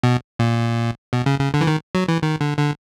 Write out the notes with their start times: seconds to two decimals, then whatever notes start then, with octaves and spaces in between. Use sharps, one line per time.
0.03 B2
0.39 A#2
1.13 B2
1.26 C#3
1.40 C#3
1.54 D3
1.61 E3
1.67 D#3
1.95 F#3
2.08 E3
2.23 D#3
2.41 D3
2.59 D3